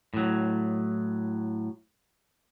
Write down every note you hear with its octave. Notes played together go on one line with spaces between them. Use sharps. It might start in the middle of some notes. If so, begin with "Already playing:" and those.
A2 F#3